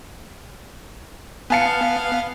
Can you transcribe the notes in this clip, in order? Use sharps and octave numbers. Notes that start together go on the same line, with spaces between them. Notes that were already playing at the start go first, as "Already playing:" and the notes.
B3 F5 G#5 A5 C#7